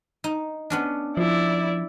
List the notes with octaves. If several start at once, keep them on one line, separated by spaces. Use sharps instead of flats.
D#4
B3 C#4 D4
F3 E4 D5